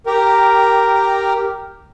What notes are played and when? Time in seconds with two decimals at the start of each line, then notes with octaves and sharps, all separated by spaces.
0.06 G4 A#4